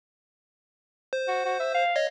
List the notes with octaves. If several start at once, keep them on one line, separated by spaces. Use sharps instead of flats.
C5
F#4
F#4
E5
F5
C#5 D#5